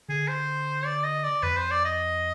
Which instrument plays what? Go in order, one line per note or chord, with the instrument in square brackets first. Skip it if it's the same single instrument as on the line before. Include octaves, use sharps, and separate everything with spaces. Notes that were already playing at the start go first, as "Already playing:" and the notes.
[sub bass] D3 [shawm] G#4
[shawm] C5
D5
D#5
D5
[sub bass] F2 [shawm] B4
[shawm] C5
D5
D#5